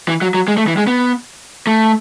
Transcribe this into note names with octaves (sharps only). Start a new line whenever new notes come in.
E3
F#3
F#3
G#3
A3
E3
G#3
B3
A3